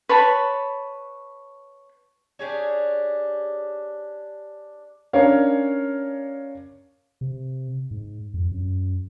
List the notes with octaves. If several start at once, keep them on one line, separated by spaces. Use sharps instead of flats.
B4 C#5 A5 B5
D4 G4 G#4 C#5
C#4 D4 A#4 C#5 F5
C3
G#2
F2
F#2